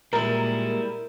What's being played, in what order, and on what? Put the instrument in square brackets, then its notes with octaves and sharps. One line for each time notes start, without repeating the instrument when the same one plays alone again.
[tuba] A#2 [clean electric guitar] G3 G#3 E4 [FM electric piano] A#4